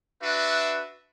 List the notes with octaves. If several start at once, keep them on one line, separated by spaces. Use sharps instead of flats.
D4 F#4 B4 E5